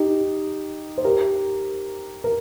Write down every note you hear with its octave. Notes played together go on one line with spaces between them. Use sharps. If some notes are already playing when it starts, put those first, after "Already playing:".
Already playing: D#4 G4
C5
G4 A#4
A#4